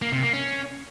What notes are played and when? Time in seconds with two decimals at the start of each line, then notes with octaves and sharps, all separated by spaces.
0.02 A#3
0.12 C3
0.23 A#3
0.33 C#4